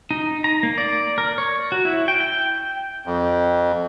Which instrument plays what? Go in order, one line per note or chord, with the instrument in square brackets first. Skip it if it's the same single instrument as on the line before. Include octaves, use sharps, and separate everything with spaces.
[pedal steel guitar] D#4
A#5
A#3
D5
A#4
C#5
F#4
E4
G5
G5
[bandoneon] F2